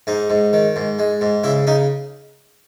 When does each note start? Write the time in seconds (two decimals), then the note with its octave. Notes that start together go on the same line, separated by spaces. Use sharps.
0.07 G#2 D#4
0.30 G#2
0.53 D#3
0.76 G#2
0.99 G#3
1.21 G#2
1.44 C#3 E4
1.67 C#3 D#4